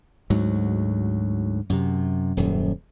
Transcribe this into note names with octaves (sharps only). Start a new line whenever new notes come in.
D2 G#2 F#3
F#2 C3
D#1 F#2